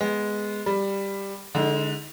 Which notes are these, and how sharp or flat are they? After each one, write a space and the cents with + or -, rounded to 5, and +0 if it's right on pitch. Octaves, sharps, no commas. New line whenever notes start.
G#3 +0 B3 +0
G3 +10 B5 +0
D3 +0 G#3 +0 D#4 +40